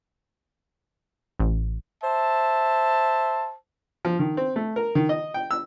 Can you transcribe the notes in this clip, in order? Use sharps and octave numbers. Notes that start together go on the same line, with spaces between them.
A1
C5 E5 A5
F3
D#3
C4
A3
A#4
D#3
D#5
G5
E6